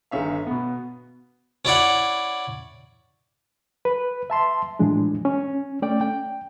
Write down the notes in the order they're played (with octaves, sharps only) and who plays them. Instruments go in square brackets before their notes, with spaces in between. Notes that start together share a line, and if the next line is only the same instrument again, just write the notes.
[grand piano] G1 D3 D#3 C#4 E5 F5
B2 B3
[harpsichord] C#4 E4 D5 F#5
[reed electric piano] B4
E5 A5 C6
A2 E3 F3 G#3 D4
C#4
A3 C#4 D5 G5
G5